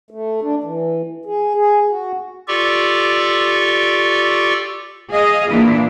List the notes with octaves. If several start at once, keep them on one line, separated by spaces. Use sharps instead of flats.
A3
D4
E3
G#4
G#4
F#4
F4 G4 A4 D5 C#6
G#4 D#5 F5
A#2 E3 D4 E4